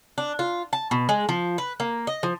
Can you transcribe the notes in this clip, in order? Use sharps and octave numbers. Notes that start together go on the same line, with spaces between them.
D4
F4
A5
B2
G#3
F3
B4
A#3
D#5
F3